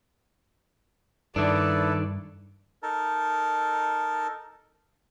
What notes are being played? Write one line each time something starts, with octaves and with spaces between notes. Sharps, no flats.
G2 D#3 D4 E4 A4 B4 D5
D#4 A4 A#4 A5